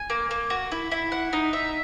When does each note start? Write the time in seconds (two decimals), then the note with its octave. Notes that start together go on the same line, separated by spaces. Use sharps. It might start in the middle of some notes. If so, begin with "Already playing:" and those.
Already playing: G#5
0.10 A#3
0.31 A#3
0.50 F#4
0.72 E4
0.91 E4
1.12 F#5
1.33 D#4
1.53 E5